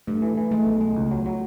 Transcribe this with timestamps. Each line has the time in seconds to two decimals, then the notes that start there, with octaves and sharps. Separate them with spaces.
0.07 G2 A3
0.22 E3
0.37 E3
0.52 G#3 A3
0.67 B1
0.81 G#3
0.96 C#2
1.11 F#3
1.26 F#3